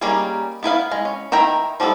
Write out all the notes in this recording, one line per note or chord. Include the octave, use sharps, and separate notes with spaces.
G3 A#3 C#4 D#4 G#4
B3 E4 B4 F5
G#3
C#4
D#3 E4 G5 A#5
F3 G3 B3 D4 A4